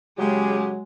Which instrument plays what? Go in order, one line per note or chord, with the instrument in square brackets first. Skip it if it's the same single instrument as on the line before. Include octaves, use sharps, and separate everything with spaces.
[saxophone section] C#3 G4 [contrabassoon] F#3 [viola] G#3